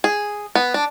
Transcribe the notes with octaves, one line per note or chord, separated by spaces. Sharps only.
G#4
B3
D4